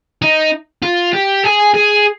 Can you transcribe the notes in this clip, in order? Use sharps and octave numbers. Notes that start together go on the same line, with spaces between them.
D#4
F4
G4
G#4
G#4